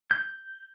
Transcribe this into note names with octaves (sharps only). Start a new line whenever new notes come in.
G6